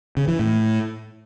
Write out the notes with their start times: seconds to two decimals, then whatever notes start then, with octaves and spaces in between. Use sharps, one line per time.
0.17 C#3
0.28 E3
0.39 A2